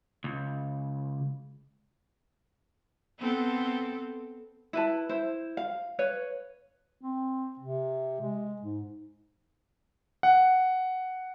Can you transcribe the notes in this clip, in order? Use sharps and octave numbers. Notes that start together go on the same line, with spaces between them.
C#2
B3 C4 A4
E4 B4 A5
E4 C5
F5
B4 C#5 F5
C4
C3
G#3
G#2
F#5